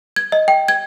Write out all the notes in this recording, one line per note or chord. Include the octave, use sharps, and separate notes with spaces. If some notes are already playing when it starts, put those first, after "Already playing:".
G#6
D#5
G5
G#6